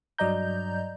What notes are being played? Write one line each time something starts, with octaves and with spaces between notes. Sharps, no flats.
G2 F#3 D5 D#5 A#5 G6